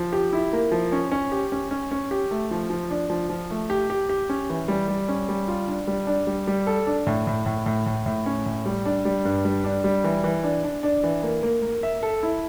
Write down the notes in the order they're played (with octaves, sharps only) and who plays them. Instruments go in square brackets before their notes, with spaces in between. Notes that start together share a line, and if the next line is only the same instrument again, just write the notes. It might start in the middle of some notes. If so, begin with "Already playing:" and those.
Already playing: [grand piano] F3
G4
E4
A#3
F3
C#4
C#4
G4
C#4
C#4
C#4
G4
A3
F3
F3
D4
F3
F3
A3
G4
G4
G4
C#4
E3
G3
G3
C#4
G3
F4
D4
G3
D4
G3
G3
A4
D4
A2
A2
A2
A2
A2
A2
C#4
A2
G3
D4
G3
G2
G3
D4
G3
E3
E3
D4
D4
D4
E3
A#3
A#3
A#3
E5
A4
E4